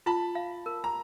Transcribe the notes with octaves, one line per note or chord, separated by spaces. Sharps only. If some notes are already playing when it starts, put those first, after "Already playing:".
F4 A5 B5
F5
A#4
A#5